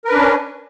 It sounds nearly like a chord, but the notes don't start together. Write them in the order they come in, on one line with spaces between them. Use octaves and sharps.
A#4 B4 D4 C#4